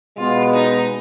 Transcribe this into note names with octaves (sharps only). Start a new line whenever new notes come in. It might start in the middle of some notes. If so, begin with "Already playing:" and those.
B2 G#3 B3 F4
D#4